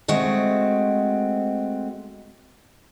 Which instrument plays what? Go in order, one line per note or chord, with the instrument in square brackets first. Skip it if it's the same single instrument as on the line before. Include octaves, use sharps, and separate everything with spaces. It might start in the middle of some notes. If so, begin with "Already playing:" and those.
[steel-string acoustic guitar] G#3 A3 C4 F#4 D#5